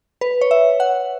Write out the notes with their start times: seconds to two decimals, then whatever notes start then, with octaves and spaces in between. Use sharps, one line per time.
0.21 B4
0.41 C#5
0.51 E5
0.80 F#5